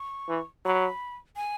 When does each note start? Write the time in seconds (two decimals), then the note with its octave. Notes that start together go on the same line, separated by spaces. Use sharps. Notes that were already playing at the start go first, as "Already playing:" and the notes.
Already playing: C#6
0.29 E3
0.65 F#3 B5
1.36 G#5